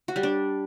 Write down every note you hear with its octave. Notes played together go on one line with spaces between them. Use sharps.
F#4
G3
D4